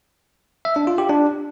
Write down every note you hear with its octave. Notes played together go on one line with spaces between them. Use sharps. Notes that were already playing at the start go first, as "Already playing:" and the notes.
E5
D4
F4
G4
D4